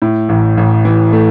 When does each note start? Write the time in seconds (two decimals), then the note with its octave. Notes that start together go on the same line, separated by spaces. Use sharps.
0.02 A2
0.29 A1
0.57 A1
0.85 E3
1.13 A3